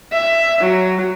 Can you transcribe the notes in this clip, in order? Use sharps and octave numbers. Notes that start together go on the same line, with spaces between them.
E5
F#3